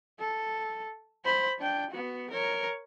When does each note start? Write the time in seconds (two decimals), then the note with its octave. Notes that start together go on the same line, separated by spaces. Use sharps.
0.19 A4
1.25 C5 B5
1.59 D4 G5
1.91 B3 F#4
2.31 A#4 C#5